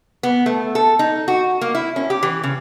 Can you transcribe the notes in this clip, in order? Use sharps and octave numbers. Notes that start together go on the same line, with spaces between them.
B3
A3
A4
D#4
F#4
A#3
E4
C#4
G4
E3
C#3